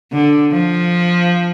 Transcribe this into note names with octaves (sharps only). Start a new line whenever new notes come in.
D3
F3